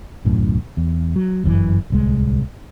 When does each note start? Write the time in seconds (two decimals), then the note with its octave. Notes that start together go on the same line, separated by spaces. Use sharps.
0.25 D1 B1 F#2 A2
0.77 E2
1.16 F#3
1.44 G1 F#2 C#3 E3
1.90 D1 C2 G#3